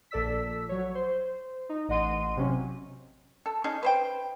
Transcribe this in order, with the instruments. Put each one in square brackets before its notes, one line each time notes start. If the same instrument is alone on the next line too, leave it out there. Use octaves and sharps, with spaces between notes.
[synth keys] A#1 A4 D5 E6 B6
F#3 C#5
C5
D#4
A1 D#5 F#5 C6 D#7
C3 F#3 C#4
[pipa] A4
C#4 D#4 G#4
B4 C5 G5